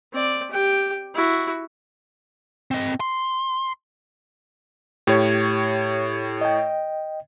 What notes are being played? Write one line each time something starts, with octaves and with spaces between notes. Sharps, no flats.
C4 D5
G4 G5
E4 F#4
C4 D#5
C6
A2 G4 C#5
D#5 G5